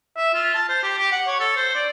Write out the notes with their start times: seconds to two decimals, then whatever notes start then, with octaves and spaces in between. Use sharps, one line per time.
0.17 E5
0.34 F4
0.54 A5
0.69 C5
0.83 G4
0.98 G4
1.12 F#5
1.27 C#5
1.40 A4
1.56 C5
1.75 D5